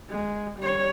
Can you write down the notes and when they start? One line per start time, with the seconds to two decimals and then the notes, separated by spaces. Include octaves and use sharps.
0.10 G#3
0.59 G3 C#5